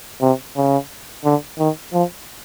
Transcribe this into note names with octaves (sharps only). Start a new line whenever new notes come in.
C3
C#3
D3
D#3
F3